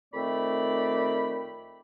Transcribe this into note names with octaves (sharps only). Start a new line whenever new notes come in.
F2 D#3 A3 C4 D5 B5